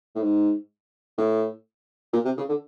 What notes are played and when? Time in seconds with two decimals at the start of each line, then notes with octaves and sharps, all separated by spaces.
0.15 A2
0.22 G#2
1.18 A2
2.13 A#2
2.25 C3
2.37 C#3
2.49 D3